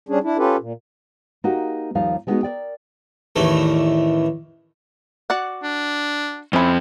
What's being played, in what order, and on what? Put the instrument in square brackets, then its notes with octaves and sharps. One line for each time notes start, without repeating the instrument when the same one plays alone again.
[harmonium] G3 C#4 D4 G#4
D4 E4
C#4 F4 G4 A4 B4
A#2
[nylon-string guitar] A#3 D#4 F#4 G4
D#2 F3 G3 D#4 F5
G3 G#3 B3 C#4 D#4 F#4
A#4 B4 D5 G5
[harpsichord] A1 E2 D#3 E3 A3
[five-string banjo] F#4 D5 F#5
[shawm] D4
[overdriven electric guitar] F2 C4 [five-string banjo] C#4 E4